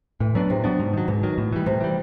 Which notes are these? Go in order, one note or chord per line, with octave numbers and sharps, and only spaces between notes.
A2 E3
D3 F#3 B3 D4
A2 C3
F#3 B3 D4
G#2
D#3 F#3
G#2 B2
D#3 F#3
A2
E3 G3
A2 C3
E3 G3